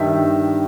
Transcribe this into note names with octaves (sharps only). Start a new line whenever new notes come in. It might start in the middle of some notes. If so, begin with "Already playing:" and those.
Already playing: G2 D#3 G3 D#4 E5